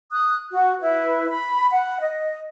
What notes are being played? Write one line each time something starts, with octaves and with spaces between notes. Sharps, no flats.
D#6 F#6
F#4
E4 B4
B5
F#5
D#5